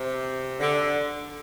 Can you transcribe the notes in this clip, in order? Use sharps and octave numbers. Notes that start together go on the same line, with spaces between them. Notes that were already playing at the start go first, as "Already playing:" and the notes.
Already playing: C3
D3